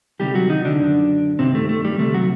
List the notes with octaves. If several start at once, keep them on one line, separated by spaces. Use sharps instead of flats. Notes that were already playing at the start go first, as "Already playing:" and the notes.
D2 C3 D#3 G3 G4
F#3 F#4
D#3 D#4
D3 D4
F#2 D3
G2 C3 D#3 C4
A3
A3
G3
D2 C3 D#3 A3
F#3 F#4